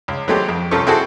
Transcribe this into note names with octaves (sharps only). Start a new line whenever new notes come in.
C#2
F#3 G#3 A3 C4 G4
F2
C2 C4 C#4 F4 A4 C#6
C4 E4 F#4 G#4 A4